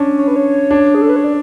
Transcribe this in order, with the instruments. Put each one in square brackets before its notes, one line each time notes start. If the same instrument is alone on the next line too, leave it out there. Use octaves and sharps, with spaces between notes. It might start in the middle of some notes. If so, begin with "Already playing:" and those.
Already playing: [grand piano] C#4 D4
[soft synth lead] C#5
B4
C#5
[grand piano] D4
[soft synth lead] G#4
A4
B4
C#5
D5